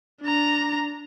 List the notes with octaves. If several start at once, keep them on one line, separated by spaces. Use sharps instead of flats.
D4 A#5